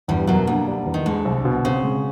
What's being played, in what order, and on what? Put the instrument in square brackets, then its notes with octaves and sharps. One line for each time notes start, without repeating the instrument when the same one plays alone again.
[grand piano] E2 [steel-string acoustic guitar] G2 G3
[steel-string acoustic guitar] F#2 F#3 [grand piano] B2
[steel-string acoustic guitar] D2 D3 [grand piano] A#3
[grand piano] G3
E2
[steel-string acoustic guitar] D#3
[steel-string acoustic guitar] D2 D3 [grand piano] G#3
[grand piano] C2
B2
[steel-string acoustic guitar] C#3 [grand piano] C4
[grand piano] G#3